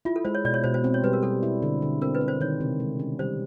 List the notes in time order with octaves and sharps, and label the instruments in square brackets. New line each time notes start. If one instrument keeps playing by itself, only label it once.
[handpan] E4 [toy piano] F4
[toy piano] A4
[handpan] G#3 [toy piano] C5
[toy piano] C#5
[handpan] B2 [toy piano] D5
[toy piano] C#5
[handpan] B2 [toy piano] C5
[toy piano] C5
[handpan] C4
[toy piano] C#5
[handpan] G3 [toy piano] B4
[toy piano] A#4
[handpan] G3 [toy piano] A4
[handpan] E4
D3
D3
[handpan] C4 [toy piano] A#4
[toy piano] B4
[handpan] C4
[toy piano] C5
[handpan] D#3 [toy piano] C#5
[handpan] C3
G#3
C#4
[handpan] G3 [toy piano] C5